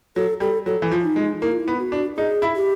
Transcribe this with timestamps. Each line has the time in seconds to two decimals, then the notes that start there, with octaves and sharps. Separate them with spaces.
0.16 F#3 A4
0.40 G3 A4
0.66 F#3 A4
0.82 E3
0.92 F3
1.03 D#4
1.16 G#3
1.41 A#3 E4
1.52 F4
1.60 E4
1.68 B3
1.79 F#4
1.92 D4
2.17 D#4 G#4
2.42 E4
2.55 G4